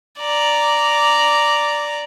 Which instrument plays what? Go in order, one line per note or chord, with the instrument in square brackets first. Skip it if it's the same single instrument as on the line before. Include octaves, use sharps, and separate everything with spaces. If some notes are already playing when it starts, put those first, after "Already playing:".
[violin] D5 A#5